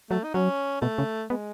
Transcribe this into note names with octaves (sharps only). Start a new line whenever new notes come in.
F#3 A3
D#4
F#3 C#4
B2 A3
C#3
G#3 B3